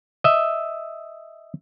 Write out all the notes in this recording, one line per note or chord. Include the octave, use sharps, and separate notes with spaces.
D#5 E5